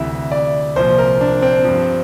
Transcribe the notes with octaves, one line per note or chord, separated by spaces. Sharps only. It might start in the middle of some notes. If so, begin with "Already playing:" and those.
Already playing: D2 C3 E3 E5
D5
C2 A#2 F3 C5
A#4
D4
C4
G2 F3